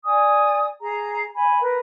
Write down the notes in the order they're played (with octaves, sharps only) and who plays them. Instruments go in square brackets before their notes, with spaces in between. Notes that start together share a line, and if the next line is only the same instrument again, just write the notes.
[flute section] D5 G#5 D#6
G#4 A#5
G#5 B5
A#4 B4